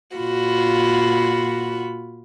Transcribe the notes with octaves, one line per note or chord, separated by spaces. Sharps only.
A#2 F4 F#4 B5